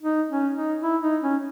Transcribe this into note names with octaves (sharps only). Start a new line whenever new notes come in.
D#4
C#4
D#4
E4
D#4
C#4